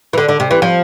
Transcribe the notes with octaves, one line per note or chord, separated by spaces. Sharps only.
E3
D3
D3
C3
E3
F3